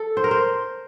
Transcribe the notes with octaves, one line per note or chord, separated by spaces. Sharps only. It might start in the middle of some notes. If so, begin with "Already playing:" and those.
Already playing: A4
C5
A#4
C5